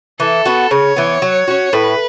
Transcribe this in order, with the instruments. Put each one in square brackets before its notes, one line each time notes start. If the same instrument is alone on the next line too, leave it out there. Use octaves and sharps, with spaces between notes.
[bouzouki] E3 [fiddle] A4
[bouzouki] B3 F#4
[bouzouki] C#3 [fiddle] C#5
[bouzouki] E3 B3
F#3
C#4 F#4
[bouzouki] A2 [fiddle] B4